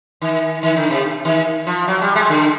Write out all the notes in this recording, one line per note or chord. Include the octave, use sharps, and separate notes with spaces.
D#3
D#3
D3
C3
D#3
F3
F#3
G3
G#3
D3